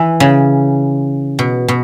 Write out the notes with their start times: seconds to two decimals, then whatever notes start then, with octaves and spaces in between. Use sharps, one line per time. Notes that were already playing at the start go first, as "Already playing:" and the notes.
Already playing: E3
0.20 C#3
1.39 B2
1.68 B2